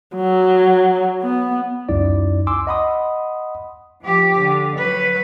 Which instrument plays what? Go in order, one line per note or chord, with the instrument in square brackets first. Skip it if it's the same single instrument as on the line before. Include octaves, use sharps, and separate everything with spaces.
[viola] F#3
B3
[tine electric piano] C#2 F#2 D#4 E4 D5
G#5 C6 D6 E6
D#5 F#5 B5 C6 D#6
[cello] F3 G4
D3
F#3 B4